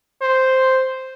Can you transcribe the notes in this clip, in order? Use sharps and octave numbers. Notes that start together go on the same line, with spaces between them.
C5